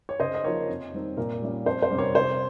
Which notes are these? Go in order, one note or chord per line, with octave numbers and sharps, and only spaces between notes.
C#5
C#3 C5 D#5
D#5
F3 A#3 D#4 A#4 C#5
F2
D#3 G3 C4 D#4
A#2 A#4
G3 C#4 F4
F2 C5
C5
C3 G3 C#4
A#4 C#5
C3 C5